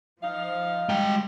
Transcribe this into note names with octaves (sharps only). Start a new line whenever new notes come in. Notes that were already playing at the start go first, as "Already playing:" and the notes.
F3 D#4 D#5 F5
G3 G#3 G5